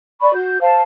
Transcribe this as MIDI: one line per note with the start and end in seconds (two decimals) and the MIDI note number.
0.21 0.32 74
0.21 0.32 83
0.21 0.32 85
0.34 0.61 66
0.34 0.61 91
0.61 0.82 72
0.61 0.82 77
0.61 0.82 81